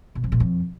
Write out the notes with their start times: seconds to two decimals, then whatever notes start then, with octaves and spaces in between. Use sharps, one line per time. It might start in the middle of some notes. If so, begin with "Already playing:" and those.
0.15 B2
0.24 F2
0.32 A#2
0.40 F2